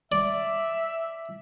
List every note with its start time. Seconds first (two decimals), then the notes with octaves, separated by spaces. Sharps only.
0.12 D5 E5